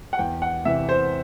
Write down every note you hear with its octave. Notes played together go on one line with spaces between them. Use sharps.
F#5
E2 G5
F#5
C3 E3 E5
C5